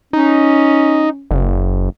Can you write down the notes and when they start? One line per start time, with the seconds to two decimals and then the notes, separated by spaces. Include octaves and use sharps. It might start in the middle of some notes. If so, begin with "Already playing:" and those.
0.13 C#4 D#4
1.31 F#1